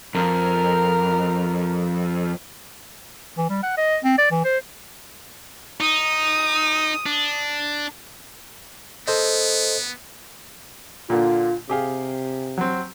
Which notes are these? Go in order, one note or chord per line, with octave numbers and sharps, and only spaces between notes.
F2 A#4
E3
G3
F#5
D#5
C4
D5
E3
C5
D#4 D#6
D4
B3 A4 C5 D#5
A#2 D3 F4
C3 G4 G#4 F5
F#3 C4